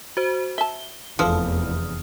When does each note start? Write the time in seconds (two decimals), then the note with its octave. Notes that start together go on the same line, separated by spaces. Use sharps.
0.17 F#4 C5
0.58 E5 A5 G7
1.19 F1 E2 D3 F3 A3 A4 D#6 F6